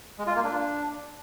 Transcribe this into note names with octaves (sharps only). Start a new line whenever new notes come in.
G#3
F4
A#3
D4